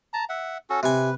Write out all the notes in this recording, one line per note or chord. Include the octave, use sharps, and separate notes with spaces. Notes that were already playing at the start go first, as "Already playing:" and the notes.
A5 A#5
E5 F#5
C#4 F#4 A4
C3 B4 G#5